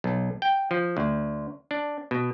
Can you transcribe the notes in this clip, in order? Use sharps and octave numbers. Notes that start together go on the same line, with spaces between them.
B1
G5
F3
D2
D4
B2